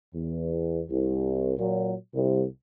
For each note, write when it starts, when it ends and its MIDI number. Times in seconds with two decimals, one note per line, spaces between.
0.14 0.81 40
0.89 1.52 36
1.58 1.94 46
1.58 1.94 54
2.13 2.43 36